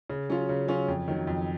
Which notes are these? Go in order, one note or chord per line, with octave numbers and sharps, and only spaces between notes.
C#3
F#3 C#4 F4
C#3
F#3 C#4 F4
F2
D#3 F#3
F2